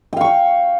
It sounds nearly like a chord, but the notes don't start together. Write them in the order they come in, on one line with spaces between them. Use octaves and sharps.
G5 F5 C#6